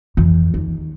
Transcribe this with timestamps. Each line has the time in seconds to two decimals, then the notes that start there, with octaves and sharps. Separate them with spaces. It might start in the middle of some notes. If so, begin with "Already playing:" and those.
0.17 F2 E3
0.54 D#2